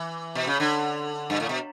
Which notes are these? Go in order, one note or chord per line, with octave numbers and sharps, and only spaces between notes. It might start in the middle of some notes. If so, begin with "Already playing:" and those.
Already playing: E3
B2
C#3
D3
G2
A2
B2